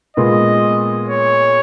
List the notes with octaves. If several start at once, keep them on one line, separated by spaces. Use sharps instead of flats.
A#2 G#3 B3 F4 D#5
C#5